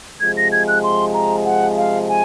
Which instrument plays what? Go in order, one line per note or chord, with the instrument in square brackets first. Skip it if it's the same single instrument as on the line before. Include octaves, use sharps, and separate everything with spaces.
[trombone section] C3 F3 G#3 [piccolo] G#6
[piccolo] A#6
G#6
F#6
C6
A#5
F#5
F5
G#5